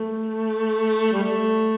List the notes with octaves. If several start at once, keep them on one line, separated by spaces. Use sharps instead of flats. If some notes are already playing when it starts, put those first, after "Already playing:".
Already playing: A3
G3
A3